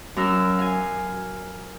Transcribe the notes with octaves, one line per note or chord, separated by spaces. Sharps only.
F#2 A#4 E6
F5 G#5